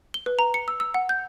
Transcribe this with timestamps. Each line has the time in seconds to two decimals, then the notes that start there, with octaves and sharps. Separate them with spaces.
0.14 G7
0.26 B4
0.39 A#5
0.54 C#7
0.68 E6
0.80 E6
0.94 F#5
1.09 G6